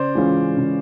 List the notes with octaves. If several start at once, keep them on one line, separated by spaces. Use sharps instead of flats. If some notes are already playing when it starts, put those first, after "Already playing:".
Already playing: C#3 C5 D5
E3 G#3 C#4 F4
C#3